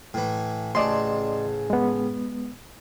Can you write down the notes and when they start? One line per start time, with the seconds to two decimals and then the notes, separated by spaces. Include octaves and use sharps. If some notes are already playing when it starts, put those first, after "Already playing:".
0.14 A2 E3
0.75 A1 C#3 D5 D#5 A5 C6
1.70 G#3 B3